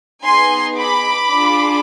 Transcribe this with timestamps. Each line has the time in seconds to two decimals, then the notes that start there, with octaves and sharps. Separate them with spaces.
0.24 B3 D#4 G#4 G#5 C6
0.79 B5 D6
1.32 D4 F4 G#4